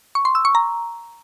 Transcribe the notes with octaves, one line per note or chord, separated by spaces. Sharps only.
C#6
C6
E6
C#6
A#5